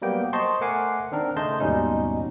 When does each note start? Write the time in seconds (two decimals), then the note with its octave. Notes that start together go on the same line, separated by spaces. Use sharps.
0.02 F#3 G3 A#3 B3 G5
0.33 C5 D#5 A5 C6 C#6
0.61 A3 A#4 F#5 G#5 D6 C7
1.12 D#3 C4 D4 A#4
1.36 C#3 A3 D#5 A5 C6 G6
1.60 D#2 G#2 B2 G3 C#4 D#4